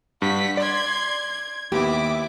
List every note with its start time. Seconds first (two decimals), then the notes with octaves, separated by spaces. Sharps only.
0.22 G2 F#5 B6
0.57 D5 C6 G#6
1.32 G#6
1.72 D#2 B3 E4 G4 D6